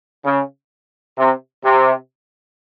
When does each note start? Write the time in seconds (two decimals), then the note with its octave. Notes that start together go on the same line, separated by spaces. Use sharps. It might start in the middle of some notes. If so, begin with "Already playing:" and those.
0.25 C#3
1.17 C3
1.64 C3